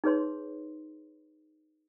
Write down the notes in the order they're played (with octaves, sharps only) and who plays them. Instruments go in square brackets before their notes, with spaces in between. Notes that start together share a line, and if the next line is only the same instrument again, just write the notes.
[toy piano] D#4 G#4 B4 C#5 C6